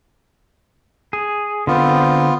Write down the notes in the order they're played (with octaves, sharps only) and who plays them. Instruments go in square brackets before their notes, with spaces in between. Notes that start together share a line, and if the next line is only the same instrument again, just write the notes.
[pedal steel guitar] G#4
[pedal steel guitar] D3 C4 [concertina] B3 F4